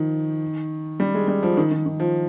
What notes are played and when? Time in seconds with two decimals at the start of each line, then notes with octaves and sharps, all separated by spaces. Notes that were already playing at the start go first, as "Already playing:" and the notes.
Already playing: D#3 F3
1.00 G3
1.14 G#3
1.28 G3
1.43 F3
1.57 D#3
1.71 D#3
1.86 D#3
2.00 F3